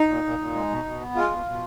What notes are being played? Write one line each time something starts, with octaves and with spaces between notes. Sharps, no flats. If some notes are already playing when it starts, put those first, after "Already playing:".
Already playing: D#4
A#2
A#2
A#2
G#3
B2
B2
B3
G#3 F4
B2
B2